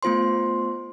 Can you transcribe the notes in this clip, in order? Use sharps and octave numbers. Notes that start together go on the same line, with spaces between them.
A3 B3 F4 C5 C6